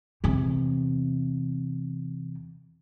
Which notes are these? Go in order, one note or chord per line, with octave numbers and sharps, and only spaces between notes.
E2 C3